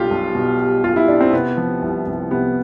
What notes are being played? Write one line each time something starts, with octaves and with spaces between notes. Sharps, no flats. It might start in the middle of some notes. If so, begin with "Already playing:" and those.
Already playing: B1 B2 G3 F4 G4
B1
B2
G3
B1 F4
E4
B1 D4
C4
C3 B3
F3
C2
C2
C3 B3